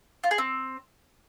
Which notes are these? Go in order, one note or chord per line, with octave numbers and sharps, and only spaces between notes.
F4
G#4
C4